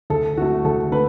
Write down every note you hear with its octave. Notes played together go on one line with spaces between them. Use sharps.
D2 A4
D3 A3 F#4
D2 A4
D3 A3 B4